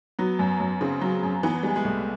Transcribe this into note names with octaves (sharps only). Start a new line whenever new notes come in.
F#3 B3
F#2
F#2
C#3 C4
F#3
F#2
E3 B3
G3 G#3
G#3
C2 A3